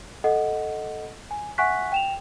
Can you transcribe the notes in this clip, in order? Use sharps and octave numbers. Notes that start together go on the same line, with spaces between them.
A4 D#5 F#5
G#5
E5 F#5 G#5 C#6 F#6 B6
G5 E7 F7